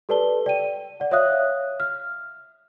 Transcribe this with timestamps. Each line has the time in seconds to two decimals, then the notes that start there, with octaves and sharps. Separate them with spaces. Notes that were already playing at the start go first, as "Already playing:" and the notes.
0.09 G4 A4 B4 D5 A5 G7
0.46 D5 G5 D#7
1.00 D5 F#5
1.11 C#5 E5 F5 D#6 F#6
1.80 F6